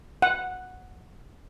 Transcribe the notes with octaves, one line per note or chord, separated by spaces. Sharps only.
F#5